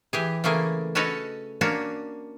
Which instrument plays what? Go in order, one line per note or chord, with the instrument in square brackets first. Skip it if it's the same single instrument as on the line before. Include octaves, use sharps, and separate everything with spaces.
[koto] E3 G4 G#4
C#3 E3 A3 A#3 G#4
C#4 F#4 A4 B4 C#5 D#5
A#3 C#4 D4 F#4